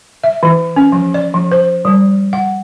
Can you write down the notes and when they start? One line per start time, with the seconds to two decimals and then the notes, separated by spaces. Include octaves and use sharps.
0.24 E5
0.43 E3
0.76 C#4
0.92 F3
1.14 D5
1.34 F3
1.52 C5
1.85 G3
2.33 F#5